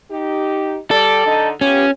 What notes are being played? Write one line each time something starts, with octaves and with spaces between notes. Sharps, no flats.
D#4 G4
G3 A4 D5
D3 D#4
B3 C#4 F4 G4